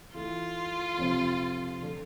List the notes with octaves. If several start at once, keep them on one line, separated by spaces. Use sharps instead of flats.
E3 A3 E4 F4
F2 C3 F3 C4
D3 F3 A3 D4